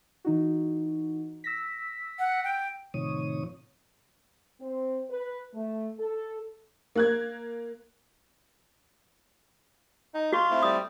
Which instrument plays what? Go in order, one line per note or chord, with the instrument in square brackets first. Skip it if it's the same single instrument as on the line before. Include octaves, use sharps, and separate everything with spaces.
[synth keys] E3 D#4 F#4
E6 A#6 B6
[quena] F#5
G5
[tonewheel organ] A2 C3 D#3 F3 C#5 D#6
[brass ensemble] C4
B4
A3
A4
[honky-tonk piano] A#3 F#6 G#6
[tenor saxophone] D#4
[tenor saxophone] F4 [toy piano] F#4 C#6
[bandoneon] A3 C4 E4
[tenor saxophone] G3 [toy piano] D#6